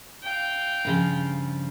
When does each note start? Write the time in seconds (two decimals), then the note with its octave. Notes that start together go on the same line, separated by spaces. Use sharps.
0.23 F5 G5
0.85 G2 C#3 F3